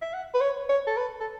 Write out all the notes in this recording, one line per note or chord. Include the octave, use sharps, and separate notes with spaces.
E5
F#5
B4
C#5
C#5
A4
B4
A4